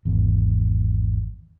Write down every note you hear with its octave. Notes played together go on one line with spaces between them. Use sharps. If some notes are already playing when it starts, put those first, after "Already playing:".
G#1 E2